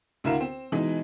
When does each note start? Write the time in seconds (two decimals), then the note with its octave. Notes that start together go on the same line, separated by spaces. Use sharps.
0.24 D2 D3 E4 A#4 F5 E7
0.40 C4
0.72 B2 E3 G#3 D#4